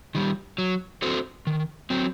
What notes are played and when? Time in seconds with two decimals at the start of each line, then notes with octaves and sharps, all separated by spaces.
0.15 D#3 G3
0.58 F#3
1.02 C4 F#4 A4 C5
1.47 D#3
1.90 F#3 C4